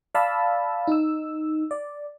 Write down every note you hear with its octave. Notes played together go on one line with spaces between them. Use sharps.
D5 F5 A5 B5 E6
D#4 E6
D5